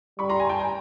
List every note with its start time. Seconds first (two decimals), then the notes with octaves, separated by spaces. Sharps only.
0.19 G3 B5 C#6
0.29 A#5 C6
0.40 G#5 A#5
0.49 G5 A5
0.59 G#5 A#5